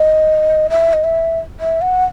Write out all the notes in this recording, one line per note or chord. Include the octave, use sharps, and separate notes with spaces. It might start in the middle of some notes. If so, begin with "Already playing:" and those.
Already playing: D#5
E5
D#5
E5
E5
F#5